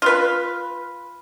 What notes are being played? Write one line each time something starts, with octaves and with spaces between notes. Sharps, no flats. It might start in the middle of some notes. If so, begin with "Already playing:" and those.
F4 B4